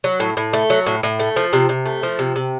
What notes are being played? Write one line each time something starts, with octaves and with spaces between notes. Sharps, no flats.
F#3
A2
A2
A3
F#3
A2
A2
A3
F3
C3
C3
A3
F3
C3
C3